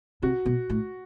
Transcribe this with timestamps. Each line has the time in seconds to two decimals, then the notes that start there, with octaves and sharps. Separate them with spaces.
0.22 C3 F#4
0.46 B2
0.70 A2